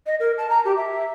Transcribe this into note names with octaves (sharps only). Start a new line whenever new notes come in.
D#5
A#4
A5
A#5
G4
E5